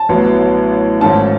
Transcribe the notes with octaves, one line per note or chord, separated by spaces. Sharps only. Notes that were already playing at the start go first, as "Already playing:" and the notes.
Already playing: A5
A1 A2 F#3 B3
G#1 G#2 D#3 A3 C#4 A5